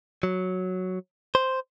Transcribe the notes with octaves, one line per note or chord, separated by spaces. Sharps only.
F#3
C5